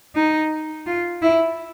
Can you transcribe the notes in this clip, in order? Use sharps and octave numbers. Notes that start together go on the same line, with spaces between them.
D#4
F4
E4